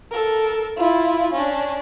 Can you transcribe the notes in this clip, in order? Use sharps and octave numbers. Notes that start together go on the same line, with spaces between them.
A4 A#4
E4 F4
C#4 D4